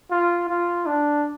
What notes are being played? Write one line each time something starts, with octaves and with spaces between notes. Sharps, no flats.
F4
F4
D4